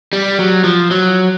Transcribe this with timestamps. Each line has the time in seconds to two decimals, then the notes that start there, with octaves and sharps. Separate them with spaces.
0.13 G3
0.39 F#3
0.64 F3
0.91 F#3